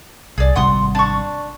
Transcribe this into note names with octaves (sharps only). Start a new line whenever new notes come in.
C2 G#4 D5
G#1 C3 G3 F#5 C6 D#6
D4 C#6